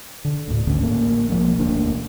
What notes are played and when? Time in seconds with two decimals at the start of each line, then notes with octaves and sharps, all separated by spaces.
0.25 D3
0.48 D2 A2
0.67 G#1 D2 D3 C#4
0.83 A1 A#3
1.30 B1 F3 G#3 A#3
1.58 E1 D2 A#3 D4